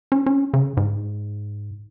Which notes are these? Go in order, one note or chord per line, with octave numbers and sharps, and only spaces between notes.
C#4
C#4
C#3
G#2